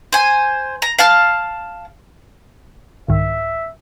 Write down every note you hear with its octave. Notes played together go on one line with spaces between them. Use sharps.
C5 G#5
A#5
F5 A5 F6
C2 G#2 D#3 E5